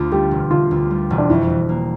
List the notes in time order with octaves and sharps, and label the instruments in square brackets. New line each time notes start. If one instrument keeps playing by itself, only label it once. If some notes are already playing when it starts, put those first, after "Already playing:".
Already playing: [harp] D2 D3 [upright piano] F4
[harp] G3 [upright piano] G4
[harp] E1
[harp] D3 [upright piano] F4
[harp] D2
G3
E1
[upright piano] D4
[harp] F2 [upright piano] E4
[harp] E3
A#3